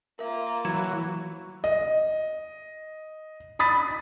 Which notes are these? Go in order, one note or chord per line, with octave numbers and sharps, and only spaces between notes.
A#3 F4 A#4 E5
E3 F#3 A#5 G#6
D#5
B5 D#6 A6 B6